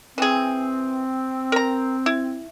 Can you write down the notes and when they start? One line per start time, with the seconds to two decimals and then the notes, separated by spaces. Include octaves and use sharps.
0.18 E3 C4 G#4
1.52 A#4 A#5
2.06 E4